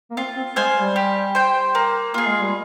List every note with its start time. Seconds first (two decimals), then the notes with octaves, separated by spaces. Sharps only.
0.11 A#3
0.17 C4 F4
0.36 C4
0.56 G#3 C5 F5 G#5
0.76 G3
0.96 G4
1.35 C5 G5
1.75 A#3
2.14 A#3 F4 G#4
2.27 G#3
2.40 G3